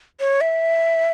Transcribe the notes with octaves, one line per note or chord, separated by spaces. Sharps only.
C#5
E5